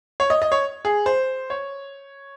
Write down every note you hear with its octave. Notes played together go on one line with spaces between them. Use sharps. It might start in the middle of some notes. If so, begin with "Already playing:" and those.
C#5
D#5
D#5
C#5
G#4
C5
C#5